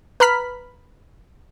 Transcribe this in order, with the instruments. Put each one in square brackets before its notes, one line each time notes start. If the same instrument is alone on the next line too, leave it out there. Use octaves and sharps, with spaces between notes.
[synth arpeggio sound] B4 A#5 B5 F6 B6